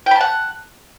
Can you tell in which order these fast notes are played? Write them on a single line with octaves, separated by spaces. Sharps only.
G5 B5 A5 F#5